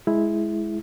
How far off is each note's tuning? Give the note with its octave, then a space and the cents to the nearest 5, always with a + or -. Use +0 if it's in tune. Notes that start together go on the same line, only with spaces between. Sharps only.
G#3 +15 E4 +0